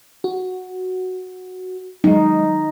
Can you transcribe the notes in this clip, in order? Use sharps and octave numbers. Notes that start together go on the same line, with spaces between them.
F#4
F#3 G#3 D#4